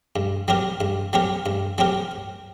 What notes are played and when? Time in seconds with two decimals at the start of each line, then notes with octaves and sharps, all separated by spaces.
0.16 G2
0.48 F#3 C4 G4 A#4
0.81 G2
1.13 F#3 C4 G4 A#4
1.46 G2
1.78 F#3 C4 G4 A#4